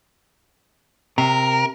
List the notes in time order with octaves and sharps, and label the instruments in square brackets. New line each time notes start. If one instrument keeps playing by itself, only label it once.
[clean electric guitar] C3 [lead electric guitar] A#4